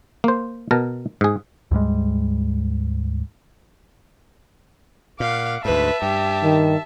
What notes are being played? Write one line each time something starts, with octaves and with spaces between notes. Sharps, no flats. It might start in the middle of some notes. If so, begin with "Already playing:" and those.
A#3 C5
B2 A#4 A5 A#5
G#2 G#4
D2 G#2 G3 G#3
A#2 F5 F#5 D6
D2 G#2 B4 E5 A5
G2 G4
D#3